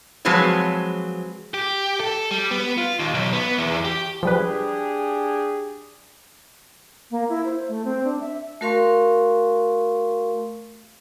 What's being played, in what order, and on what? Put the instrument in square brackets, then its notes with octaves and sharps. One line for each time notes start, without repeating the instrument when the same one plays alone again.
[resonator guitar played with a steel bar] F3 F#3 G#3 C4 B4 C#5
[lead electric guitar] G4
A4
G3
B3
F4
D#2
B1
B3
E2
G4
[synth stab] F3 G3 B4 [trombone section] D4 G4 G#4
[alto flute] A#3
E4
C5
A3
C4
D4
E5
[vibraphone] A3 F#4 A#4 F5 C6 C#6